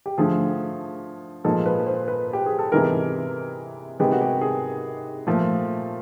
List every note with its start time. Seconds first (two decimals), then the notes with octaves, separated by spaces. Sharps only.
0.06 G4
0.18 D3 F3 A3 G#4
1.44 A#2 F3 G#3 A4
1.66 B4
1.87 C5
2.08 B4
2.33 G4
2.46 G#4
2.59 A4
2.72 C3 E3 G#3 B3 A#4
3.99 C3 D#3 G#3 B3 G4
4.12 F#4
4.21 G4
4.41 G#4
5.27 A#2 F3 A3